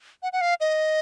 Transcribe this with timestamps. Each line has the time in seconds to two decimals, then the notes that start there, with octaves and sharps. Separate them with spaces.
0.23 F#5
0.33 F#5
0.41 F5
0.61 D#5